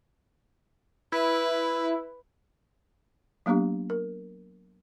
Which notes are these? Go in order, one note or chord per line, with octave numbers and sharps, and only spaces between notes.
E4 B4
F#3 A#3 B3 D4 G4
A#4